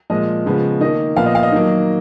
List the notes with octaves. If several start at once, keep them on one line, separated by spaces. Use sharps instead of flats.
A#2 F3 G#3 D#5
C#3 F3 G#3 B3
D#3 A#3 D#5
A#2 F3 B3 F5
D#5
F5
D#5
D#3 F#3 A#3